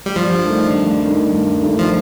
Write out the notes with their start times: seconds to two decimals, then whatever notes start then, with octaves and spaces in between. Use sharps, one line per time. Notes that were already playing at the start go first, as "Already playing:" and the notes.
0.06 G3
0.16 G2 F3
0.45 D#3 A3 D4
0.74 G2
1.03 D#3 A3 D4
1.32 G2
1.61 D#3 A3 D4
1.79 F3